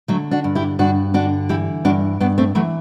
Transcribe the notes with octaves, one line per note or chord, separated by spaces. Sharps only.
D3 F#3 A3
D4 F#4
G2
E4 G4
G2 D4 F#4
D3 D4 F#4
E3 E4 G4
G2 D4 F#4
G2 B3 D4
A3 C4
E3 F#3 A3